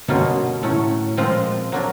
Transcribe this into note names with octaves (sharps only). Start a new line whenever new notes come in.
B2 D3 G3 A#3 C#4 F4
A2 F#3 A3 C#4
A#2 F3 G#3 C4 F4
F#3 A#3 D4